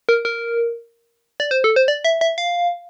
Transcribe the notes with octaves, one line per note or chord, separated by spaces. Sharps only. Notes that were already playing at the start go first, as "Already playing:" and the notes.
A#4
A#4
D5
C5
A4
C5
D5
E5
E5
F5